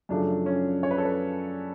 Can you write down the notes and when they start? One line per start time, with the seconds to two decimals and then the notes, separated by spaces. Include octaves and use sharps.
0.09 F#2 C#3 F3 A3 D4
0.46 C#4
0.83 C#5
0.91 B4
0.98 A4
1.05 B4